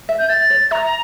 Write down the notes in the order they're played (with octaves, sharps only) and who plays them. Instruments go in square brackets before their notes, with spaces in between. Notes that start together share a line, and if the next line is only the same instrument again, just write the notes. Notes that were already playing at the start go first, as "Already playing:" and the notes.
[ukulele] E5
[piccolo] G6
[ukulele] E5 [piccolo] A6
[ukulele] C#5
[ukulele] E5 [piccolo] A#5